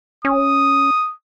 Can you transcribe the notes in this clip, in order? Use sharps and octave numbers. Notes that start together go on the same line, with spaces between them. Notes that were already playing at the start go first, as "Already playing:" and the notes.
C#4 D#6